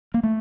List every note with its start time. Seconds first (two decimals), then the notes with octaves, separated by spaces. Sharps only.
0.14 A#3
0.23 A3